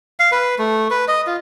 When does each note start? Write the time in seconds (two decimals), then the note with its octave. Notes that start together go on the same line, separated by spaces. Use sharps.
0.20 F5
0.32 B4
0.59 A3
0.90 B4
1.08 D#5
1.27 F4